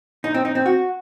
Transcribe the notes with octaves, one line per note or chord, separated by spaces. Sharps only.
D#4
C4
D#4
C4
F#4